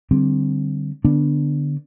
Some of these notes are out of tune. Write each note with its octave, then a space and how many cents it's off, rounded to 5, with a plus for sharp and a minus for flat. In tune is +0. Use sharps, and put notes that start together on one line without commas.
D3 +0 G3 -25 C4 +0
D3 +5 B3 +0 D4 +0